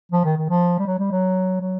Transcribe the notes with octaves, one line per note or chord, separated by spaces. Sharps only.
F3
D#3
D#3
F3
G3
F#3
G3
F#3
F#3